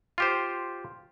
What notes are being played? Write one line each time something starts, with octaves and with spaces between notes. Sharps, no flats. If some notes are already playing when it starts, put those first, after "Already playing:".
F4 G4 C5